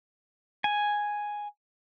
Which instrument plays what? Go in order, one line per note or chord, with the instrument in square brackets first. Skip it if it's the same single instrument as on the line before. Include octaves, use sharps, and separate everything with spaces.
[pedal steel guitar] G#5